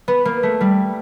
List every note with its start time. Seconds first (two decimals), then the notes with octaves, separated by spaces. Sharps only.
0.08 B3
0.25 A#3
0.43 A3
0.61 G3